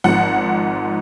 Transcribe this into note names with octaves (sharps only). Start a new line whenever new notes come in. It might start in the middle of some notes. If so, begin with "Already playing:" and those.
G#1 G#2 F3 F#5